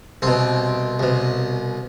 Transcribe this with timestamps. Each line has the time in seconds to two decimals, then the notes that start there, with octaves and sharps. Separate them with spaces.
0.22 C2 B2 C4
0.99 C2 B2